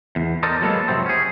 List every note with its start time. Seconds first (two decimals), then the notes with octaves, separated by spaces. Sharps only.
0.16 E2
0.43 A4 A#4 C5 D5 D#5
0.62 F#3 G#3 A#3 B3 A4
0.88 F2 A2 C3 F#3 C4
1.06 C#4 G#4